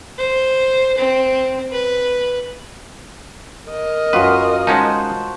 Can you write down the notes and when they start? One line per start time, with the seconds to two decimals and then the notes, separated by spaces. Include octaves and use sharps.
0.18 C5
0.98 C4
1.72 B4
3.70 A#4 D#5
4.13 F#2 F4 F#4 B4 F5
4.67 G#3 C#4 D#4 C5 F#5 A5